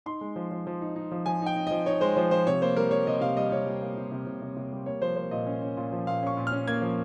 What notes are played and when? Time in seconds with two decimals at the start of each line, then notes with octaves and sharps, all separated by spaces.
0.06 D#4 C6
0.21 G#3
0.36 F3
0.51 F3
0.67 F3
0.82 D#4
0.96 D#4
1.12 F3
1.26 F3 G#5
1.42 D#4 G5
1.56 D#4
1.67 F3 D#5
1.86 D#4 C#5
2.01 G#3 C5
2.17 F3 C5
2.31 F3 C5
2.47 C3 C#5
2.62 A#3 C5
2.76 G3 A#4
2.91 G3 C#5
3.07 C3 D#5
3.21 C3 F5
3.37 G3 D#5
3.52 C3 C#5
3.67 G3
3.82 A#3
3.97 C3
4.12 C3
4.27 C3
4.42 C3
4.57 C3
4.72 G3
4.86 A#3 C#5
5.02 F3 C5
5.16 A#3 C5
5.31 A#2 D#5
5.47 C#4
5.62 C#4
5.77 A#2
5.92 F3
6.07 A#2 F5
6.22 C#4 C#6
6.37 A#2
6.47 F6
6.52 C#4
6.68 A#3 G#6
6.82 F3